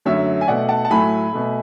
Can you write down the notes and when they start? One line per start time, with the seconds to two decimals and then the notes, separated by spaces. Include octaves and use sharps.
0.05 F#2 D3 F#3 A3 C#5 E5
0.41 G#5
0.48 B2 A3 D5 F#5
0.69 F#5 A5
0.85 A5
0.90 A2 F#3 A3 G#5 B5
1.33 B2 A3